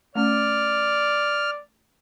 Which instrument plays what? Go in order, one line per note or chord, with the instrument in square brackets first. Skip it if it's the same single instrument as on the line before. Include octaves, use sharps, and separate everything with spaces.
[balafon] A3 C#4 [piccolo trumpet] D5 [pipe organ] F6